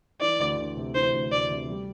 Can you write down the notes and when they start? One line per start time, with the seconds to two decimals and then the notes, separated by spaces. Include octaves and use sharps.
0.21 E3 D5
0.39 D2
0.57 D2
0.77 C3
0.95 E3 C5
1.13 D2
1.32 D2 D5
1.50 C3
1.68 G3